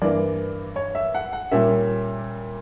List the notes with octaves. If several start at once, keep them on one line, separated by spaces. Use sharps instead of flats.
G2 E3 A#3 D5
C#5
E5
F#5
F#5
A#2 G3 A#3 C#4 E5